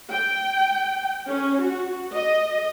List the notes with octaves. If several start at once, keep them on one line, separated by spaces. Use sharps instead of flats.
G5
C#4
F#4
D#5